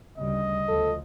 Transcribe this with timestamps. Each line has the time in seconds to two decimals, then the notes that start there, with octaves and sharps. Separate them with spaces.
0.18 D2 C#3 G3 D#5
0.68 D2 F3 A4